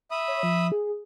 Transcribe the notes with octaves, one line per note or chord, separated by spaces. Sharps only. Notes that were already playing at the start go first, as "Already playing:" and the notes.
E5 B5 D#6
C#5
F3
G#4